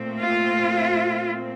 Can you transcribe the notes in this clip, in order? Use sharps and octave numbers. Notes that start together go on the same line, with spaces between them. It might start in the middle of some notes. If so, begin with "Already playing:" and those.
Already playing: A#2 A3 C4
F4